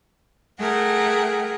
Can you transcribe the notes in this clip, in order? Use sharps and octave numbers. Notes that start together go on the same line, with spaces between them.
A3 G#4 A#4 F#5 G5